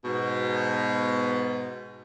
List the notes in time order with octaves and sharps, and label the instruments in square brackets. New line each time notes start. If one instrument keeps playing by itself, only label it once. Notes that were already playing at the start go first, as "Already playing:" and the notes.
[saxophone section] G#2 B2